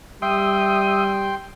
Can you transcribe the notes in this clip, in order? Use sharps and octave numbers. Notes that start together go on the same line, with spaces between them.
G3 E5 G5 C6 D#6